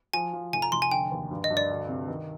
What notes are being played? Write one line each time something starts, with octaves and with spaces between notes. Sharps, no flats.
F3 G#5
F3
F1 G#5
A#5
F1 C6
G#5
D3 G5
D#2
G2
D#5
G2
D5
D2
C3
D#3